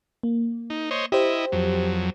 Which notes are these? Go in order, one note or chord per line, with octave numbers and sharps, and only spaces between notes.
A#3
D#4
C5 C#5 D#5
E4 G4 C5 D#5
F2 F#3